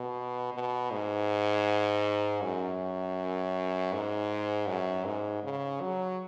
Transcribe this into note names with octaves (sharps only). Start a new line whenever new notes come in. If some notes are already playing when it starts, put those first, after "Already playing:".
Already playing: B2
B2
G#2
F#2
G#2
F#2
G#2
C#3
F#3